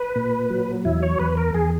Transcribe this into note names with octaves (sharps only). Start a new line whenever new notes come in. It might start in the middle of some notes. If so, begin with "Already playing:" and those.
Already playing: B4
A#2
F#3
E2 E4
C#5
E2 B4
A#4
E2 G#4